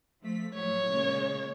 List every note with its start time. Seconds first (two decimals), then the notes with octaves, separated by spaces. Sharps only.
0.21 F3 A3 B6
0.55 A2 F#3 C#5
0.89 A#2 C#3 G#3